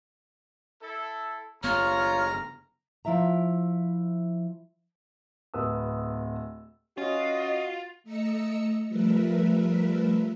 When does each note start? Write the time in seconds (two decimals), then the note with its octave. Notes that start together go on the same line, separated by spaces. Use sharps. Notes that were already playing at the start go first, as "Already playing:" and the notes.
0.82 E4 A4
1.64 F#1 B3 F4 C#5 A#5 F6
3.05 F3 E4 E5 A#5
5.54 D1 B4 D#6 E6
6.98 C#4 F4 F#4 D#5
8.04 A3 D#5 A#5 E6 C#7
8.88 F3 G3 A3 A#4 B4 E5